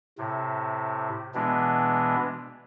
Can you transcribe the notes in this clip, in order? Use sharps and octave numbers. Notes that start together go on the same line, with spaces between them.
A2 C3
B2 E3 G#3 B3 D4